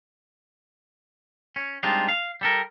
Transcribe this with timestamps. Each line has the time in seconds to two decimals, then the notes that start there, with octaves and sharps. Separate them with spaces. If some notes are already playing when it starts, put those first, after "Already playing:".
1.56 C#4
1.83 G3 G#3 C4 D4 D#4 F4
2.09 F5
2.41 G3 A4 A#4